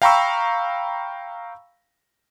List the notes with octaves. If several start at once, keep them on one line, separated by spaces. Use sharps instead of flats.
F5 G5 A#5 B5 C#6 E6